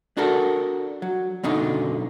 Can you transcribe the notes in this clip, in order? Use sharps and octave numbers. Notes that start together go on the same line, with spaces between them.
D4 F#4 A4 A#4
F#3
F#2 B2 D3 D#4